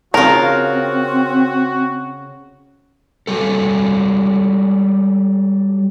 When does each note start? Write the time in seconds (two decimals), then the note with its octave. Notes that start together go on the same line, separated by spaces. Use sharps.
0.14 C#3 C4 F4 F#4 A#4
3.27 F#3 G3 A4